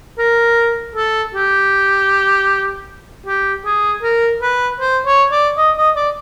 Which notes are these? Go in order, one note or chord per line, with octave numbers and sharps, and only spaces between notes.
A#4
A4
G4
G4
G#4
A#4
B4
C5
C#5
D5
D#5
D#5
D5